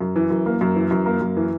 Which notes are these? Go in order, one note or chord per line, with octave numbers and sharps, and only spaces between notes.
F#2
E3
F#2
A#3
F#2
E3
F#2
A#3
F#2
E3